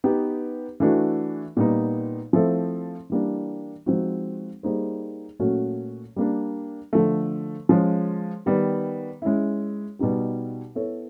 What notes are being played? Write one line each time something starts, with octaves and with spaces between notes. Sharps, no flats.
B3 D#4 G4 B4
E3 A3 D4 F#4
A#2 G3 B3 D#4
F3 A3 C4 E4 A4
E3 G3 A#3 D4
F3 G#3 C4 D#4 F#4
G3 A#3 D#4 G#4 C5
A#2 F#3 A3 C#4 F#4
G3 A#3 D4
D3 F3 A3
F3 G#3 C#4
D#3 G3 B3
G#3 C#4 E4
B2 G3 B3 D#4 G4
B3 E4 A4 C#5